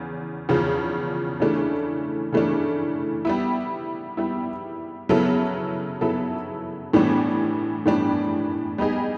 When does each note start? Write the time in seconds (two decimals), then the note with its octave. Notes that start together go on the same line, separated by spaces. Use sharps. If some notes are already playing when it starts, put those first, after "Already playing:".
Already playing: E2 C#3
0.49 E2 C#3 F3
1.40 C#3 E3 A3 D4
2.33 C#3 E3 A3 D4
3.25 G3 B3 E4
4.17 G3 B3 E4
5.09 C#3 F#3 B3 E4 A4
6.01 C#3 F#3 B3 E4 A4
6.93 A2 E3 G3 B3 D4
7.86 A2 E3 G3 B3 D4
8.78 G3 B3 D#4 G#4